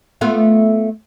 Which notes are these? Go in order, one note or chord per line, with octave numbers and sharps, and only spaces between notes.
A3 B3 F4